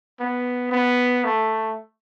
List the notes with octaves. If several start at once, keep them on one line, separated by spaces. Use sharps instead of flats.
B3
B3
A3